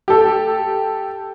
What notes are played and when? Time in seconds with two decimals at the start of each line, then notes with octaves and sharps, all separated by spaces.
0.08 G4 A4